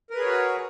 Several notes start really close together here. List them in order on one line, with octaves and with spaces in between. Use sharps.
A#4 B4 G#4 C#5 F#4